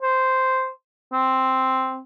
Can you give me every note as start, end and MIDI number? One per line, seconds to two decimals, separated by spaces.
0.03 0.69 72
1.13 2.00 60